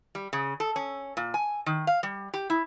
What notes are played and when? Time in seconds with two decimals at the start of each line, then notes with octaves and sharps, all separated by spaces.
0.15 G3
0.33 C#3
0.60 A4
0.76 C#4
1.17 A#2
1.34 G#5
1.66 D#3
1.87 F5
2.03 G3
2.34 G4
2.50 E4